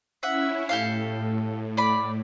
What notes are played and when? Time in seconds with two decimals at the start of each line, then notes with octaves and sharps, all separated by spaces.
0.23 C#4 E4 E5 F#5
0.69 A2 G4 A4 F5
1.77 D5 B5